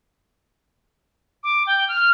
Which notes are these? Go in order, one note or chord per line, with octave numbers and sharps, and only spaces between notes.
D6
G5
F6